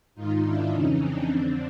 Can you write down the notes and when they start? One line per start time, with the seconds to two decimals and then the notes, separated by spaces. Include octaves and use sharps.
0.15 G#2 D#3 D#4 F4
0.44 D4 E4
0.72 F2 C#3 E3 C#4 D#4
1.01 C4 D4
1.29 F2 D3 C4 D4